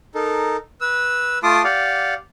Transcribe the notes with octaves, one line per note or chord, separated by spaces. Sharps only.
D#4 A4 A#4
B4 E6
A3 F4 A5 C6 D6 D#6
G4 D5 F5 F#5